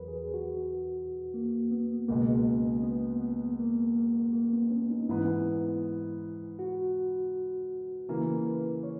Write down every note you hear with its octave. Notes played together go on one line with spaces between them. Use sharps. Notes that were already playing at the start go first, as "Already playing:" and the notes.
Already playing: E2 F#3 A#4 B4
G#4
F#4
A#3
B3
C#2 B2 G#3 A#3
B3
B3
A#3
A#3
A#3
B3
C#4
D#4
G#2 E3 B3 E4
F#4
C#3 E3 A#3 A#4
B4
C#5